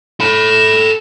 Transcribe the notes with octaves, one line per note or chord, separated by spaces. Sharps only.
A4 B5 E7